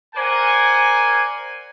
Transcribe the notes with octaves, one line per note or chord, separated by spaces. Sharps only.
A#4 C5 D5 F#5 G#5